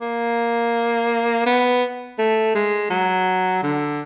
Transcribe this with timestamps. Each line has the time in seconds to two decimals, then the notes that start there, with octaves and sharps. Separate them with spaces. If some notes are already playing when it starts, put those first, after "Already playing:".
0.01 A#3
1.46 B3
2.19 A3
2.55 G#3
2.90 F#3
3.63 D3